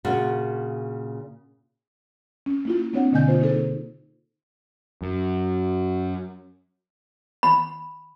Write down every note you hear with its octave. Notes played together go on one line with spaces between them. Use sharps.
A#2 C#3 F#4
C#4
A#3 E4 F4
A#3 C4 D4 C#5 F#5
B2 D3 A#3 D#5 G#5 G6
F4 C5
A#3 D#4 G#4 A4 C5
F#2
B5